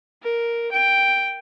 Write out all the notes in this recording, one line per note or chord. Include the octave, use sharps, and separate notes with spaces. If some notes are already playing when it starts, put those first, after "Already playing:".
A#4
G5